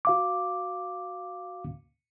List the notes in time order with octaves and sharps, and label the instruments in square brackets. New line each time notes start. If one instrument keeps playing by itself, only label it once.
[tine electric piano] F#4 F5 D6